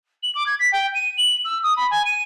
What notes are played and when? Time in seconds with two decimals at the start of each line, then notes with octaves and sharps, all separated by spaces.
0.23 F#7
0.35 D6
0.46 G#6
0.59 B6
0.72 G5
0.94 D#7
1.18 F#7
1.45 E6
1.63 D#6
1.77 B5
1.91 G#5
2.05 D#7